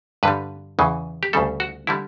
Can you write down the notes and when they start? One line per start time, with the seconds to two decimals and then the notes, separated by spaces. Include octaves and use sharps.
0.23 G2 D3 G3 B4
0.79 E2 C#3 E3
1.23 G4
1.33 D2 C#3 G3 A4
1.60 F#4
1.87 D3 G3 E4